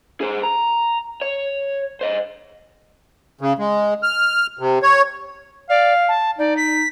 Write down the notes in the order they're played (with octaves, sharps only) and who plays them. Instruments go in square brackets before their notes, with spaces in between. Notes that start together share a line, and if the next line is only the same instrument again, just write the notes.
[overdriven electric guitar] G#4 C5
A#5
C#5
C5 D#5
[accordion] C#3
G#3
F6
C3
C#5
[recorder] D5 [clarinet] F5
[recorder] A5
[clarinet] D#4 [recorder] D5
[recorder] B6